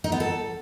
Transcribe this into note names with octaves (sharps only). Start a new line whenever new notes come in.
D#4
B3
A4